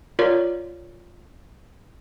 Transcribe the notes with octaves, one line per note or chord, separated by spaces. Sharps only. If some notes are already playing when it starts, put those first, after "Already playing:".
F4 A#4 C#5 D5